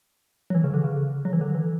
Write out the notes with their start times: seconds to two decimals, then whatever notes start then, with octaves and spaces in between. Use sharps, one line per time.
0.50 F#3
0.55 E3
0.64 C#3
0.74 D3
0.84 C#3
1.25 F#3
1.33 E3
1.41 D3
1.55 E3